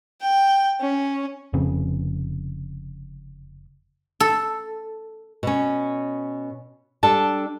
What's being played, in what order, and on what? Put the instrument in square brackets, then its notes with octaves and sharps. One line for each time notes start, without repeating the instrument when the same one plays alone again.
[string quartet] G5
C#4
[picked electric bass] F1 F2 C#3 C4
[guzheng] A4
[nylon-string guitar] B2 C#4
G3 D4 A4 A5